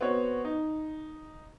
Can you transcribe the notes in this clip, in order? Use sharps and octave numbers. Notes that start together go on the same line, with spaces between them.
B3 C4 F#4 C#5
D#4